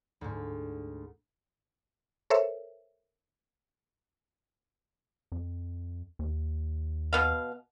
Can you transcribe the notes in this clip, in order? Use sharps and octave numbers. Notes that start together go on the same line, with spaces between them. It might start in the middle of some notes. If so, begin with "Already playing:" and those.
D2 G#2
A4 A#4 C5 C#5 E5
F2
D#2
B2 B3 F5